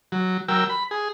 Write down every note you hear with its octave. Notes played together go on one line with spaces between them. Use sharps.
F#3
F#3 A#4 G5 E6
B5
G#4